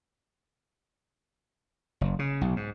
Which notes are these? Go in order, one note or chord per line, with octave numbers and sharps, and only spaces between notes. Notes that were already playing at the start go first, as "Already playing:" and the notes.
F#1
C#3
B1
G#2